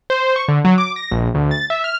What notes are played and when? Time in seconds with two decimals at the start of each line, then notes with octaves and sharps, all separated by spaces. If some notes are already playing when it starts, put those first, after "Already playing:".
0.10 C5
0.36 C#6
0.48 D3
0.65 F#3
0.78 D6
0.96 A#6
1.11 A#1
1.34 D2
1.51 A6
1.70 E5
1.84 F6